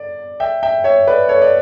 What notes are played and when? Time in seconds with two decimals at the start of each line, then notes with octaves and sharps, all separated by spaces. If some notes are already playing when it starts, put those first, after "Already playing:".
Already playing: D5
0.40 E5 G5
0.63 E5 G5
0.84 C#5 E5
1.07 B4 D5
1.29 A4 C#5
1.42 D5